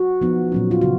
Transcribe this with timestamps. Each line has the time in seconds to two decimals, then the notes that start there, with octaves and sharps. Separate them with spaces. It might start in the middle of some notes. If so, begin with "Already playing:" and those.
Already playing: F#4
0.21 F3 B3 D#4
0.52 A#2 F#3 C#4
0.71 F4
0.81 C#3 F#4